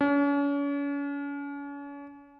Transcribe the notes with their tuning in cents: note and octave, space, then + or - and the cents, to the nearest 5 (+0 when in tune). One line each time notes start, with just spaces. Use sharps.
C#4 +40